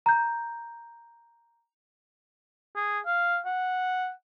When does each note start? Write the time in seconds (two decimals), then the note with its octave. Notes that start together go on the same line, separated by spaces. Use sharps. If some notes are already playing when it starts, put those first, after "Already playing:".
0.06 A#5 G6
2.76 G#4
3.06 F5
3.46 F#5